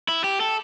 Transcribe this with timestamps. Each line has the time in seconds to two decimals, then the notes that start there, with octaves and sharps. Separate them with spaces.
0.08 E4
0.24 G4
0.41 A4